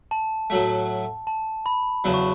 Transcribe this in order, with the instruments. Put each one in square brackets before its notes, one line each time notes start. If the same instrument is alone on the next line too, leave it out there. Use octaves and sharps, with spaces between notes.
[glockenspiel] A5
[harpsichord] A2 F#3 A3
[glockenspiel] A5
B5
[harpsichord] E2 C#3 F#3
[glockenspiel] C#6